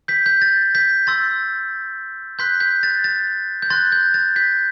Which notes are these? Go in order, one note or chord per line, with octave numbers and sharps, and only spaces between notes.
G6 B6
G6
A6
G6 B6
C6 E6 G6 A6
C6 F#6 G6 B6
G6 B6
A6
A6
G6
C6 F#6 A6
G6
A6
G6 B6